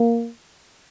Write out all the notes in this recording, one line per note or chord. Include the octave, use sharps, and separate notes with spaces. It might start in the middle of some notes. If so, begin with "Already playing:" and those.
Already playing: A#3